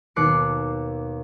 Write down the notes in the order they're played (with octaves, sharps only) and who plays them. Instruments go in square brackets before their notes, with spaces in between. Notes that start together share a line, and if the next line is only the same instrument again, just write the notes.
[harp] D#2 B2 D6 F#6 C7 C#7